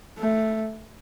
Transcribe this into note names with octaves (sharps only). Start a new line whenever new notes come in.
A3